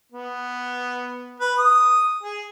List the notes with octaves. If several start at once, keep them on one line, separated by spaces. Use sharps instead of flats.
B3
B4
D#6
G#4